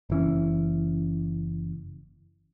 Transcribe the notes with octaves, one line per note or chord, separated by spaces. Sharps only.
F#1 E3 C#4